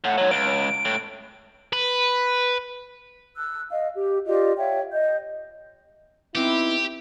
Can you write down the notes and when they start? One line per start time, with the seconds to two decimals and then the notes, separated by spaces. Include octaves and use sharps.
0.04 A2 F#5
0.18 G#2 F#3 C#5
0.31 C#2 D7
0.85 A2
1.73 B4
3.36 E6 F#6
3.70 D#5 F5
3.94 G4
4.27 F4 G4 D5 D#5
4.57 C#5 E5 F5 G5
4.91 D#5 G6
6.35 B3 C4 D#4 E4 G4